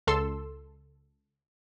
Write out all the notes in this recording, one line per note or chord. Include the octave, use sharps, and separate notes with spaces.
C#2 A4 C6 E6